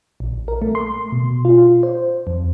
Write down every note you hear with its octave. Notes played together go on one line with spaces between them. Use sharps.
A#1
A#4
A3
C6
B2
F4
C5
F2